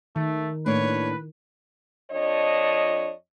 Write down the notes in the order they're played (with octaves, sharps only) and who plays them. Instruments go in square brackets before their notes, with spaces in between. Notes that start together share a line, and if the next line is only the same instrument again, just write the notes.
[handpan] D#3 [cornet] A3
[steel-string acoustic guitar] A2 A#3 D4 [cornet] B4 [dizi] C#5
[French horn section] F2 F3 D4 C#5 D#5